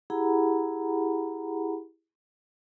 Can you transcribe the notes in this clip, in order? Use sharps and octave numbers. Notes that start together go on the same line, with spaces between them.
E4 G4 G#4 F#5 A#5 B5